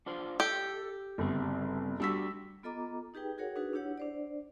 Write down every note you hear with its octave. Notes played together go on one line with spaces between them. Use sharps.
D4 F4 C5
G4 A4
G1 C#3 G3 C4
G3 D4 F#4 E6 B6
B3 F4 A4 D#5 A#5 D6
D#4 G4 G#4 B4 G5
F#4 G#4 A#4 C#5 F#5
D4 D#4 F#4 G#4 B4
D4 E4 G4 C#5 F#5
D4 C5 D5